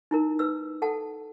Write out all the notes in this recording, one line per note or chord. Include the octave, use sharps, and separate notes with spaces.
D#4 E4 A#4
B4 E6
A4 F#5 A5